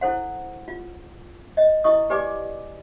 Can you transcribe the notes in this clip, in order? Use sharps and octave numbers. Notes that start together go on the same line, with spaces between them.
E4 A4 C5 F#5
F4
D#5
E4 D#5 C#6 D#6
G4 B4 D5 G#5 D6